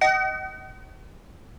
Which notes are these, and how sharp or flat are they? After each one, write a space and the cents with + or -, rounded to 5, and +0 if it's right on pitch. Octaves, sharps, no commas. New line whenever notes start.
D#5 +0 F#5 +45